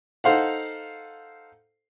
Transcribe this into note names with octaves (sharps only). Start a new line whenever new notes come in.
D#4 A4 C5 F5 F#5